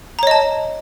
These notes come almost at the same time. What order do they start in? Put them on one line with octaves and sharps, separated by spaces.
A#5 C#5 D#5 A5